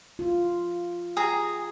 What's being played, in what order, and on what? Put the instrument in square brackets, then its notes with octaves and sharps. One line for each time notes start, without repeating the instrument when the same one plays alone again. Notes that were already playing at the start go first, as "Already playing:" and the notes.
[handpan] F4
[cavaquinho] G#4 A#5